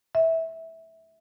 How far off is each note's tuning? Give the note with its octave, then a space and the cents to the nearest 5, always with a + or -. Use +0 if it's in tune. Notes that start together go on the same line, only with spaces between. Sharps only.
E5 -15